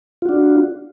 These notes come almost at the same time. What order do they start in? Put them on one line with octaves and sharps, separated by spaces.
F4 F#4 D4